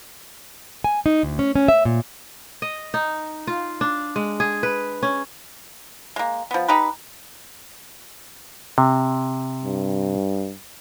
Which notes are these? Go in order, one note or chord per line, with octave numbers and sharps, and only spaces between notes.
G#5
D#4
D2
C#4
C#4
E5
A#2
D#5
D#4
F4
D4
G#3
G#4
B4
C#4
G#3 A#3
F3 B3
D#4 G4 B4
C3
G2